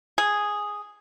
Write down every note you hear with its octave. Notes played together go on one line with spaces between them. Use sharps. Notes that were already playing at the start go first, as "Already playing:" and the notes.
G#4